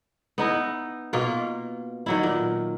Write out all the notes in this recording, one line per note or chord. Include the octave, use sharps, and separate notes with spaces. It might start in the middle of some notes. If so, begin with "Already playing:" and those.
B3 D#4 E4
B2 A#3 F4
D#3 F#3 E4
A#2